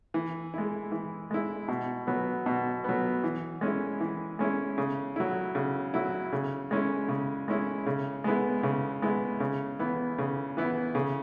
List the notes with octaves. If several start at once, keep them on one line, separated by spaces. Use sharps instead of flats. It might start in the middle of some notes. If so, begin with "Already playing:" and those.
E3
G#3 E4
E3
G#3 E4
B2
F#3 B3
B2
F#3 B3
E3
G#3 C#4 E4
E3
G#3 C#4 E4
C#3
F#3 E4
C#3
F#3 E4
C#3
G#3 C#4 E4
C#3
G#3 C#4 E4
C#3
G#3 B3 E4
C#3
G#3 B3 E4
C#3
E3 B3 E4
C#3
E3 B3 E4
C#3